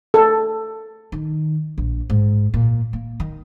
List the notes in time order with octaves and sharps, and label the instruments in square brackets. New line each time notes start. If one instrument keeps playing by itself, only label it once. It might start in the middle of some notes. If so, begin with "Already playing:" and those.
[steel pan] A4
[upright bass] D#3
A#1
G#2
A#2
A#3
D#3